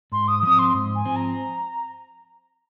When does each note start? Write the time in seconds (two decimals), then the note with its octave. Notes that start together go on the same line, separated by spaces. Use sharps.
0.12 G#2 C6
0.27 D#6
0.43 F3 C4 D#6
0.58 C6
0.74 G#2
0.95 G#5
1.05 F3 C4
1.16 A#5